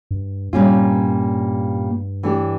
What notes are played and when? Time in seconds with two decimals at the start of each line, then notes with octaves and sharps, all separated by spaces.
0.11 G2
0.53 G2 A#2 G3 A#3 C#4 F4
2.23 E3 A3 D4 G4